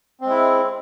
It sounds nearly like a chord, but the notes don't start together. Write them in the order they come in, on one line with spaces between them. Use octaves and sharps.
C4 G#3 E4